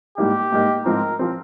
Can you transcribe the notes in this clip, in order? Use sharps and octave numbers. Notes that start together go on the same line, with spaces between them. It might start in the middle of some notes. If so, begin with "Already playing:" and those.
G#2 G3 A#3 D#4 G4
G#2 G3 A#3 D#4
G#2 F3 C4 A#4
F3 C4